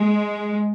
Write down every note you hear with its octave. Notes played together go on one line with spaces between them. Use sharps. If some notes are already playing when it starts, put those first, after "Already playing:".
Already playing: G#3